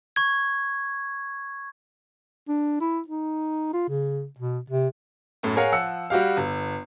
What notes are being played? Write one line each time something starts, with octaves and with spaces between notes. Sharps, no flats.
C#6 G#6
D4
E4
D#4
F4
C#3
B2
C3
F#2 A2
G#4 A#4 C#5 F5 F#5 G#5
F3 F#5 E6 C#7
G3 F#4 G4 F5
G1